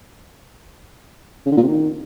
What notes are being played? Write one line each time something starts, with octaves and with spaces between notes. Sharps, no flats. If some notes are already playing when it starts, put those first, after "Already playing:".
C#3
D3
A#2
C3
D#3